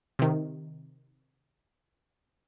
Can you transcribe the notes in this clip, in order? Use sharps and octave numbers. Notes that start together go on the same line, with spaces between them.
C3 D#3